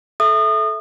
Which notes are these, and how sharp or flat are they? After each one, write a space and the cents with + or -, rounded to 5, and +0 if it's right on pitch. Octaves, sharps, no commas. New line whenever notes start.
A4 -15 E5 +0 D#6 -30